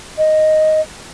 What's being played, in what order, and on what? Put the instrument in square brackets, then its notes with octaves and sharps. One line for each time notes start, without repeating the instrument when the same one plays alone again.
[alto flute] D#5